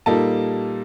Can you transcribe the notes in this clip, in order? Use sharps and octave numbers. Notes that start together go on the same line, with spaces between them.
A#2 G3 A#3 D#4 A4 A5